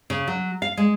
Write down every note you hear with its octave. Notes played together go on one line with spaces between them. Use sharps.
C#3
F#3
F5
G#3